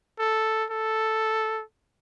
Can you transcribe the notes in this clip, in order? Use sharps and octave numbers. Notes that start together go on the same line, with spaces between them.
A4
A4